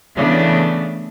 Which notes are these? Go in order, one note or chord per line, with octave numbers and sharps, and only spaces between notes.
C#3 E3 A3 B3 D4